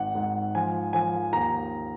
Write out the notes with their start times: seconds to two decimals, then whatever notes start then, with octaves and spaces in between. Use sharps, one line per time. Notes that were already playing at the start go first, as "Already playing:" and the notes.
Already playing: G#1 F#5
0.15 G#2
0.55 F3 G#5
0.93 F3 G#5
1.32 D#2 A#5